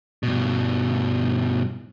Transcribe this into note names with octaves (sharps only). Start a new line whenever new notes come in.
G2 B2